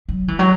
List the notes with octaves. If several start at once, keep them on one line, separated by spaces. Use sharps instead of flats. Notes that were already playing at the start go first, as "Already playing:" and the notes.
F#3
E3
F#3